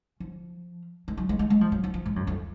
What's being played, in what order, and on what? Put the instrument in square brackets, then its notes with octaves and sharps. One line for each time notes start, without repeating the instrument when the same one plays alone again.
[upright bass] F3
G#3
F#3
G#3
G#3
G#3
F3
F#3
F3
F3
G#2
F#2
F2